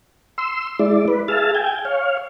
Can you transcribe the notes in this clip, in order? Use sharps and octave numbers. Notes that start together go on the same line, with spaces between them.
C6 E6
G#3 E4 D5
B4
G#4 E5 F5 A5
G5 G#5
C#5 F5